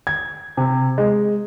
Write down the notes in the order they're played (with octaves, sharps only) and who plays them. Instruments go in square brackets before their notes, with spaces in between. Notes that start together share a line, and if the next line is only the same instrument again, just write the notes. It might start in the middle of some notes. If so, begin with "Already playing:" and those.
[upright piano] G#6
C3
G#3